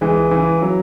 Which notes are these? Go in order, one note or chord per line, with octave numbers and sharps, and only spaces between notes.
C#2 E3 G#3
C#3 E3
F#3